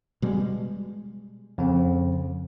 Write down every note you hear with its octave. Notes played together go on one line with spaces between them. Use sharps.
B2 G3 G#3
F2 C#3 C4